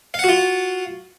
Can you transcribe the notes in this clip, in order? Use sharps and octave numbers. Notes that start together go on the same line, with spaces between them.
F4 F#4 F5 F#5